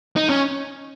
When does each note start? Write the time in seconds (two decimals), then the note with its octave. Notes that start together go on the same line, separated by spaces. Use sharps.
0.16 D#4
0.29 C#4